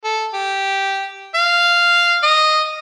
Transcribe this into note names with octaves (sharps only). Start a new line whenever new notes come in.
A4
G4
F5
D#5